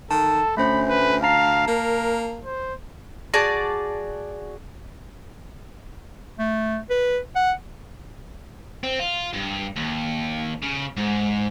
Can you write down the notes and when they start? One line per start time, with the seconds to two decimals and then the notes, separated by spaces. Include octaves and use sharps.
0.11 D#3 A4 A5
0.57 D2 A3 C#4 C5 B5
0.88 B4
1.23 F5 A5 A#5 C7
1.67 A#3 A#4
2.45 C5
3.34 F#4 G#4 D5 A5
6.39 A3
6.90 B4
7.36 F#5
8.83 C4
8.99 F4
9.33 G2
9.76 D#2
10.62 C#3
10.97 G#2